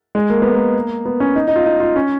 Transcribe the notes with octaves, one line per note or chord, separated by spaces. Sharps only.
G#3
A#3
B3
A#3
B3
C#4
D#4
D#4
F4
D#4
F4
C#4